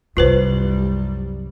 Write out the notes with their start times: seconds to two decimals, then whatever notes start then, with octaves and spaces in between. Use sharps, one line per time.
0.17 C2 F#2 C3 G3 F4 B4 C5